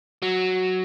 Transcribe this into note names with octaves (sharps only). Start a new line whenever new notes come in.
F#3